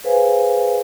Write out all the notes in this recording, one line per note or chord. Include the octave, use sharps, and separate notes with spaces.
G#4 B4 C5 F5 G#5